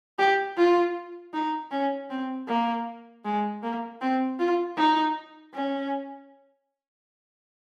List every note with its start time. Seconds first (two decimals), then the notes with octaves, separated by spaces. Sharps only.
0.19 G4
0.57 F4
1.34 D#4
1.71 C#4
2.10 C4
2.48 A#3
3.25 G#3
3.63 A#3
4.01 C4
4.39 F4
4.77 D#4
5.54 C#4